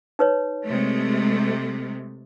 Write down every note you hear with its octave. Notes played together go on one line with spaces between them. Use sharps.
D#4 B4 C#5
C3 G#3 A3